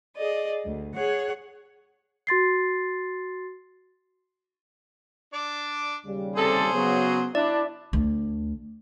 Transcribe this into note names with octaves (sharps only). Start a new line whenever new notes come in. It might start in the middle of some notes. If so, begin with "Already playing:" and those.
G#4 D5 D#5
D2
G#4 C#5 F#5
F#4 C6 A6 C7
D4 D5
D#2 C#3 G3
C3 G#4 A4 C5 A5
C#3 F#3 B3
D4 E4 D5 E5
D2